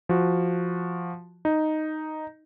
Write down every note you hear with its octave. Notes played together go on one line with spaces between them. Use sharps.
F3 F#4
D#4